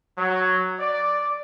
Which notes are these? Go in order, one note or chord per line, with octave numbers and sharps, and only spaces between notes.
F#3
D5